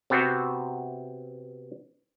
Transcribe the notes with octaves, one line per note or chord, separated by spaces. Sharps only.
C3 B3 C4 F#4